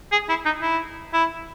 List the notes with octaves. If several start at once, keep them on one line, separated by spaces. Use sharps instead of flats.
G#4
E4
D#4
E4
E4